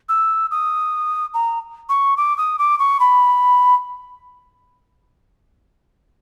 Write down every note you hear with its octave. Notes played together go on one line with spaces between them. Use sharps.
E6
D#6
A#5
C#6
D6
D#6
D6
C#6
B5